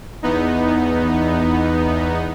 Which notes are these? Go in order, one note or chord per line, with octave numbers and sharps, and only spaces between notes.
E2 B3 D#4